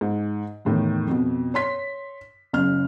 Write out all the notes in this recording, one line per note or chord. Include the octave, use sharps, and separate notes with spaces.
G#2
E2 A2 D#3
F2 B2
C#5 C6 B6
F#1 C#3 F6